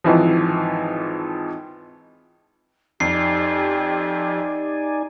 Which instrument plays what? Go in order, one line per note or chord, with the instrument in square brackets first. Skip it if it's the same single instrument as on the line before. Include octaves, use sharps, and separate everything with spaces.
[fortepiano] G#1 E3 F3
[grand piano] F2 [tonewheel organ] D#4 D5 G#5 [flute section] G4 [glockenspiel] C7